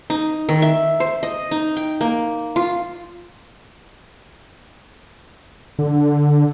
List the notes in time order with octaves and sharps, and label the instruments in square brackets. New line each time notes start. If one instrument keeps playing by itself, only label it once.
[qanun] D#4
D#3
E5
C5
D#5
D#4
G5
A#3
F4
[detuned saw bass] D3